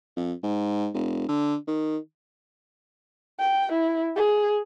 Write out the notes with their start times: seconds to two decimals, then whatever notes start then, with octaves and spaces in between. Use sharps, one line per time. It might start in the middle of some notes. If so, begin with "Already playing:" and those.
0.17 F2
0.43 G#2
0.94 F1
1.28 D3
1.67 D#3
3.39 G5
3.72 E4
4.16 G#4